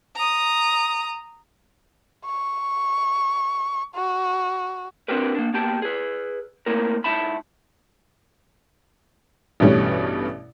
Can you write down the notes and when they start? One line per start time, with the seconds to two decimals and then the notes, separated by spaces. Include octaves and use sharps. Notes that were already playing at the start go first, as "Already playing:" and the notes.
0.16 A#5 D#6
2.25 C#6
3.95 F#4
5.08 C4 D4 F#4 G4 A#4 B4
5.35 A#3 D4
5.54 A#3 B3 G4 G5 A5
5.82 G#4 B4
6.66 A3 A#3 C4 E4 A#4
7.04 G#2 A3 D#4 E4 A5 B5
9.60 A1 G2 B2 G3 A3 C#4